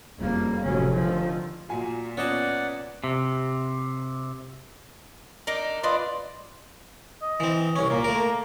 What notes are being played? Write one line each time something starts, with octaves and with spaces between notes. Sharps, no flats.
F#1 F2 G3 A#3
F1 F2 A2 C#3 F#3 C#4
D3 D#3 F3
A#2 F4 F#4 G#5
B3 C#4 F4 D5 D#5 F#5 A5
C3
A#3 D4 D#4
D4 F4 B4 D5 D#5
D#5
E3 C4
C2 C#4 C#5
A#2 A#3
A3 A#4